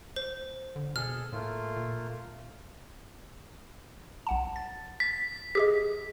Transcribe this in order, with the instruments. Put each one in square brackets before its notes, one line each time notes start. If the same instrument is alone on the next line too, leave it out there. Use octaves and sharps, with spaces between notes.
[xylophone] C5
[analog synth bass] D3
[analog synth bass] B2 [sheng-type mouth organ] G#4 A4 [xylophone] F6
[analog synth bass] A2 [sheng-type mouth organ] A3 A#3 F4
[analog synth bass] A#2
[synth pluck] B1 F#5 A5
A6
[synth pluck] A6 [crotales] B6
[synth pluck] G4 G#4 D#5 [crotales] B6